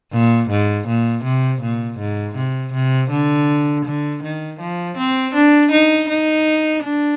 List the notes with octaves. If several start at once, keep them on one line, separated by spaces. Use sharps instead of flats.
A#2
G#2
A#2
C3
A#2
G#2
C3
C3
D3
D3
D#3
F3
C4
D4
D#4
D#4
D4